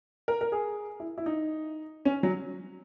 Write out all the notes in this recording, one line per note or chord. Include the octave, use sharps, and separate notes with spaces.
A#4
A#4
G#4
E4
E4
D#4
C#4
F#3